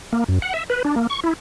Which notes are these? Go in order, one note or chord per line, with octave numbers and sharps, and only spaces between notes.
A#3
F#2
F#5
E5
B4
D4
A#3
C#6
E4